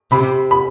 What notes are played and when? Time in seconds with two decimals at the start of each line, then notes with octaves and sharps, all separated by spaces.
0.11 C3 B5
0.51 B5